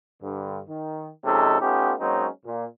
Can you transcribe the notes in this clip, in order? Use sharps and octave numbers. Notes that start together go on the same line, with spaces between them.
G2 D3
D#3
C3 F3 G#3 C#4 D#4 A4
A3 B3 C#4 D#4 F4 G4
F#3 G#3 A#3 C4 C#4 D#4
A#2